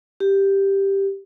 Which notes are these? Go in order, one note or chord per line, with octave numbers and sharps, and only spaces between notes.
G4